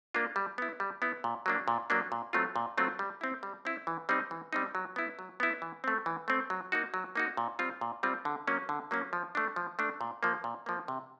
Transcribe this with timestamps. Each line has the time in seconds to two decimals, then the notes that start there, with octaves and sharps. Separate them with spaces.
0.14 A#3 D4 F4
0.36 G3
0.58 B3 E4
0.80 G3
1.02 B3 E4
1.24 A#2
1.46 F#3 A#3 D4
1.68 A#2
1.90 F#3 A#3 D4
2.12 A#2
2.33 F#3 A3 C4 F4
2.56 A#2
2.78 F#3 A3 C4 F4
2.99 G3
3.21 C4 E4
3.43 G3
3.65 C4 E4
3.87 E3
4.09 G3 C4 D#4
4.31 E3
4.53 G3 C4 D#4
4.75 F#3
4.96 B3 E4
5.19 F#3
5.40 B3 E4
5.62 E3
5.84 A3 C4
6.06 E3
6.28 A3 C4
6.50 F#3
6.72 A#3 D#4 F#4
6.94 F#3
7.15 A#3 D#4 F#4
7.37 A#2
7.59 G3 C4 F4
7.81 A#2
8.03 G3 C4 F4
8.25 D3
8.47 F#3 A#3 C#4
8.69 D3
8.91 F#3 A#3 C#4
9.13 F3
9.35 A3 D4
9.56 F3
9.79 A3 D4
10.01 A#2
10.23 F3 A#3
10.44 A#2
10.66 F3 A#3
10.88 C3